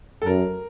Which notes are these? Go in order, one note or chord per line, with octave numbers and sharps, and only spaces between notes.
A4
F#2 A#4